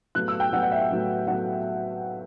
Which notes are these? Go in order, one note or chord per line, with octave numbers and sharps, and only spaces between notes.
A2 F#3 B3 F#6
E6
G5
A2 F#3 B3 F#5
F#5
E5
A2 F#3 B3
A2 F#3 B3 F#5